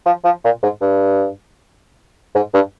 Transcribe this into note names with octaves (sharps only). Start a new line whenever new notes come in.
F3
F3
A#2
G#2
G2
G#2
G2